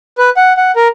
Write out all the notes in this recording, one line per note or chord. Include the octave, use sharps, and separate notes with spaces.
B4
F#5
F#5
A#4